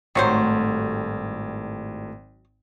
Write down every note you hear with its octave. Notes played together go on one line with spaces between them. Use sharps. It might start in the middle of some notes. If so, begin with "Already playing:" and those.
G#1 A2 D#3 F#3 G3 A3 C5